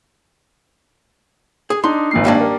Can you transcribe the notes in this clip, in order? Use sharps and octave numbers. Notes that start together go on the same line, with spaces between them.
G#4
D4 D#4 C6
G#1 A#2 C7
G3 A#3 D4
A#4